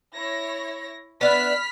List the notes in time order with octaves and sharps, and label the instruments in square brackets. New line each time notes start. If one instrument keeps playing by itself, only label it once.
[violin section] E4 C#5 A#6
[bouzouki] B3 D4 E5 [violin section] B5 F6 B6